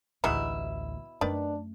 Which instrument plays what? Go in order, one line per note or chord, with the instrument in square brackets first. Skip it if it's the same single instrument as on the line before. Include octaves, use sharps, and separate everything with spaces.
[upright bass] A1 D2 [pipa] B2 E4 [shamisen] G#3 B3 D#4
[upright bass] F#2 A3 [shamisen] D#3 B4 D5 [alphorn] D4